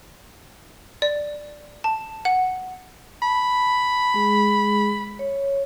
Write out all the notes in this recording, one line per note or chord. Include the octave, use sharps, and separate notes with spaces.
D5
A5
F#5
A5 B5
G#3 G#4
C#5